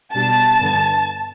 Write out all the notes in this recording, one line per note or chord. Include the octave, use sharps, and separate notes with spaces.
B2 G3 D4 A5
G2 D3 B3